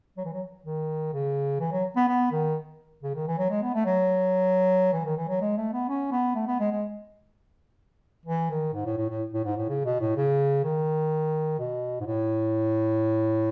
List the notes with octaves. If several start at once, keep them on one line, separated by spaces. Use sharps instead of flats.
F#3
E3
F#3
D#3
C#3
E3
F#3
B3
B3
D#3
C#3
D#3
E3
F#3
G#3
B3
A3
F#3
E3
D#3
E3
F#3
G#3
A3
B3
C#4
B3
A3
B3
G#3
G#3
E3
D#3
G#2
A2
A2
A2
A2
G#2
A2
C#3
B2
A2
C#3
D#3
B2
G#2
A2